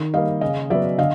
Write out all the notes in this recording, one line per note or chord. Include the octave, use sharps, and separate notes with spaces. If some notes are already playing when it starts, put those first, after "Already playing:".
Already playing: D#3
G3 A#3 D#5 F5
C#3 D#5 F5
F#3 B3 D5 E5
D3 D#5 F5